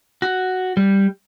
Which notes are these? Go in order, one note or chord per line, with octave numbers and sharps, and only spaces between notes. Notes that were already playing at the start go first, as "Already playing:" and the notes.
F#4
G3